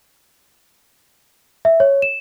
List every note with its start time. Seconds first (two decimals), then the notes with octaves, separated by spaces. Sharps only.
1.65 E5
1.80 C#5
2.02 E7